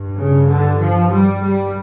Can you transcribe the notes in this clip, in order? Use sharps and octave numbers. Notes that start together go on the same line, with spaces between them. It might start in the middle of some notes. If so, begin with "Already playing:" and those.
Already playing: G2
C#3
D3
F3
G3
G3